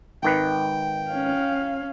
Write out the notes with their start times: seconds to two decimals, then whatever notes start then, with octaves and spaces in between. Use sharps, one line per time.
0.23 G#1 D#3 B4 G5
1.10 C#4 F5